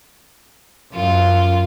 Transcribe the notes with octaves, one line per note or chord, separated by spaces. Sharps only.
F#2 F4